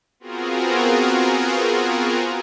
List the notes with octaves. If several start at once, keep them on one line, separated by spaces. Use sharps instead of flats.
B3 C4 F4 F#4 G#4 A#4